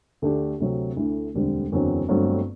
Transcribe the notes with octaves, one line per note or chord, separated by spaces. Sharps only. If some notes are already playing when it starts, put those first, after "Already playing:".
D2 D3 A3 D4 G4
D2 C3 F#3 C4
D2 D3 A3 E4
E1 D2 D3 G3 C4
F#1 E2 D3 F#3 C4
G1 G2 F#3 A3 C4